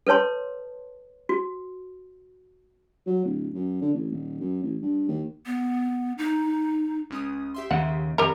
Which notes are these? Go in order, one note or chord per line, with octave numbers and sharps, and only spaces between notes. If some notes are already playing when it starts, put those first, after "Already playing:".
A4 B4 C#5 A5 C6
F#4
F#3
D1
F#2
D3
A1
D#1
F#2
A1
G2
D#2
B3
D#4
C#2 C#4 D#6
G4 E5 C6
D#2 C#3 F#5
F2 D#3 G3 A#4